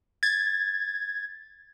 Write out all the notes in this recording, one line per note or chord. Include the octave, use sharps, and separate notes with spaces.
G#6 A6